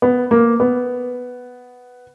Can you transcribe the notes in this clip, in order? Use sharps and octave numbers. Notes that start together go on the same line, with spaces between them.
B3
A#3
B3